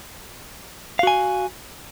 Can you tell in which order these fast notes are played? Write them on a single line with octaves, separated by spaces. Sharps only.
F5 F#4 G#5